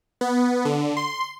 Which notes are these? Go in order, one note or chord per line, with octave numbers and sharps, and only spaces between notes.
B3
D3
C6